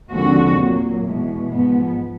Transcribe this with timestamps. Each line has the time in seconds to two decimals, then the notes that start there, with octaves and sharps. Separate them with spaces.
0.11 D#2 D3 F3 G#3 C4 F#4
0.58 A#2 F#3 A#3
1.04 E2 B2 G#3
1.51 G#2 F3 G#3 B3